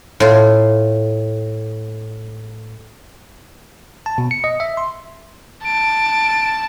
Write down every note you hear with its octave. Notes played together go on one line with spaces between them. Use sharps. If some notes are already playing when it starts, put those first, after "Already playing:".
A2 F4
A5
B2
C#7
D#5
E5
C6
A5 D7